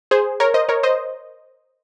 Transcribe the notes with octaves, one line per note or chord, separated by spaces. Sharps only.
G#4 C5
A#4 C#5
C5 D#5
A#4 C#5
C5 D#5